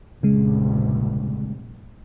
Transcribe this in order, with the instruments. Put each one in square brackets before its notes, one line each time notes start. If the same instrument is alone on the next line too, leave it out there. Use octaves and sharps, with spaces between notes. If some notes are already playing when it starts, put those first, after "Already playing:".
[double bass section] F1 A#1 G2 [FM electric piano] C#3 G#3